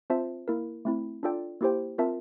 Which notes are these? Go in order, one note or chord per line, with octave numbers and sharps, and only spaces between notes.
C4 F4 C5 E5 A5
A#3 E4 A#4
A3 C4 E4
D4 F4 A4 D5 G5
A#3 E4 G4 C5 G5
C4 F4 A#4 E5 A5